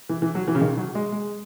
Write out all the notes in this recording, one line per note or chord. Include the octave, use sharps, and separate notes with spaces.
E3
E3
F#3
E3
C#3
D#3
F#3
G#3
G#3